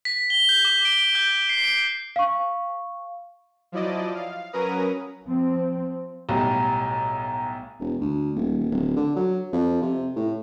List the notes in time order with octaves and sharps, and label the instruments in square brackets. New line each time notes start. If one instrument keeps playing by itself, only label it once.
[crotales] B6
G7
G6
D6
D7
G6
C7
D7
[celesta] F5 C#6
[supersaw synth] F3 F#3 E4 D5 D#5
F5
F#3 C#4 A#4 B4 A#5 D#6
[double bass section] F3 C4
[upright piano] B1 A2 G3 [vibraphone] A#5
[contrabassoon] E1
D2
D#1
D#1
D1
D3
F#3
F2
C3
A2